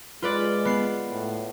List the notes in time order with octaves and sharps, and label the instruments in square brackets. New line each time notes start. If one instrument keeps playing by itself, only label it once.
[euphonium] G#3 [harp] F4 B4 D5
[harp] B3 C7
[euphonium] A2